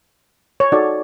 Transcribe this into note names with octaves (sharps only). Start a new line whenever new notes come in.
C#5
D#4 F#4 A4 D5